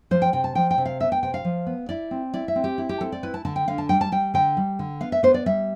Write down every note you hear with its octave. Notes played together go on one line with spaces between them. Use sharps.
F3 C5
G5
C3 G5
A5
F3 G5
G5
C3
F5
B3 E5
G5
C3 G5
F5
F3
B3
E4 D5
C4
E4 D5
E5
C4
G4
E4
G4
C4 A4
D5
E4 B4
A5
D3 A5
G5
D3 F5
A5
G3 G5
A5
G3 G5
D3 G5
G3
D3
B3 F5
E5
B3 C5
D5
G3 E5